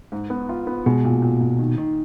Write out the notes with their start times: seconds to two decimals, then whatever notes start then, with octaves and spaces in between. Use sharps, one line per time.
0.12 G#2
0.30 B3
0.49 F4
0.67 B3
0.86 B2 G#3
1.04 A#2
1.22 A#2
1.41 A#2
1.59 D#3
1.78 D#3